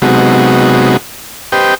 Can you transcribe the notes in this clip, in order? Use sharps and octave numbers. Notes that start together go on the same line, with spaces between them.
C3 F#3 G#3 B3 D#4 F#4
G4 B4 C5 D#5 G5